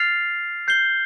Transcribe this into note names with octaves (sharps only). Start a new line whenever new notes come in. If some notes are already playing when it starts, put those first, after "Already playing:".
Already playing: F6 A6 C7 F7
G6 C7 G7